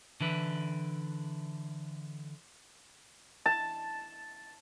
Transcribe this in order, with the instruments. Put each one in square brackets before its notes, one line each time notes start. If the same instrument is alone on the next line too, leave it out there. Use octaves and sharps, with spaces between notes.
[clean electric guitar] D3 E3 B4
[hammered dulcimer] A5